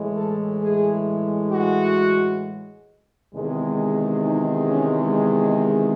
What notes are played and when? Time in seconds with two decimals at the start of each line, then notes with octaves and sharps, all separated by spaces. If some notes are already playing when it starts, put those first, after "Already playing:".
Already playing: A2 E3 G#3
0.15 A4
0.62 G#4
1.51 F#4
3.34 E2 C3 D#3 G#3
4.25 D#4
4.70 C#4
5.46 D#5